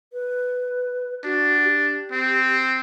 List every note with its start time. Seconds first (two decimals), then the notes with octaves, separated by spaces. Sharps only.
0.13 B4
1.24 D4 F#4
1.63 G4
2.12 C4